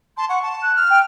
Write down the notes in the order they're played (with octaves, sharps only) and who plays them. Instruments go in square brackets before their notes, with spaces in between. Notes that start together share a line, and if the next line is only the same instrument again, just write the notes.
[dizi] A5 [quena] C6
[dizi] F#5 [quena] C#6
[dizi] A5
[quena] F#6
[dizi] F6
[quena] G5